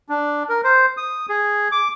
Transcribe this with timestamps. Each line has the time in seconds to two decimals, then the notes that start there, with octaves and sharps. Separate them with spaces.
0.09 D4
0.49 A#4
0.64 C5
0.97 D#6
1.29 G#4
1.72 D6